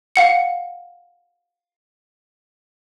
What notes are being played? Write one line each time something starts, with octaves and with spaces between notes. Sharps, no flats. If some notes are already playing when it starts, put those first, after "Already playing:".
F5 F#5 C#7